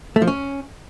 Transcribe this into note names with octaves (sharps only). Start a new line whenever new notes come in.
A3
F3
C#4